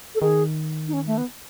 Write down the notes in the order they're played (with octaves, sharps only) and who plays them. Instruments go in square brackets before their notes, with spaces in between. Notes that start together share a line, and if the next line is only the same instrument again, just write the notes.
[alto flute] A4
[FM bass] D#3 [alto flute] G#4
[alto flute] D#4
C#4
A3
B3